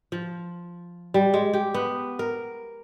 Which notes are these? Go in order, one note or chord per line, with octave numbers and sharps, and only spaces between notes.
F3
G3
G#3
G4
B3
A#4